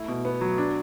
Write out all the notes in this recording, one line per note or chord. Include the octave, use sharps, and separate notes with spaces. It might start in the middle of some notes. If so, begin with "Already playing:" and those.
Already playing: A3 E4
B2
B3
F#3
D4